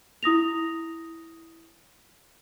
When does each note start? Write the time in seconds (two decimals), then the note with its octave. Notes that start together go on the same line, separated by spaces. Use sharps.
0.23 E4 D#6 A#6 F7